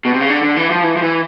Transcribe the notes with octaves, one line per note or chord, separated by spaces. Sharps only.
B2
C3
C#3
D3
D3
E3
F3
E3
F3
E3